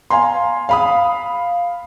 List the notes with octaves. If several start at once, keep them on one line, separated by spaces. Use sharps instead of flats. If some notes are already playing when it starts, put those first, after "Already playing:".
F5 G#5 A#5 C6
F5 B5 D#6